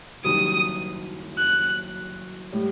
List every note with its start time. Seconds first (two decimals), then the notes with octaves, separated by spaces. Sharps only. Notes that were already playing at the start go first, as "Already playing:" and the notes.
0.24 F#1 F#2 D#3 G3 D#6
1.38 F#6
2.52 A2 G3